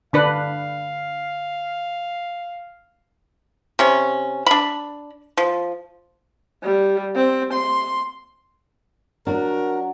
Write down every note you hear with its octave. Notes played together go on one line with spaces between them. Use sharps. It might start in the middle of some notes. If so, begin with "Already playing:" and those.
D3 D4 B4 F5
C3 C#4
D4 B5
F3
G3
C4
C6
F#3 D4 F#4 A#4